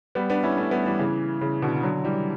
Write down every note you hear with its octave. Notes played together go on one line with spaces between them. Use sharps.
G3 B3
B3 D4
C#4 E4
A3 C#4
G3 B3
E3 G3
C#3 E3
C#3 E3
B2 D3
D3 F#3
E3 G3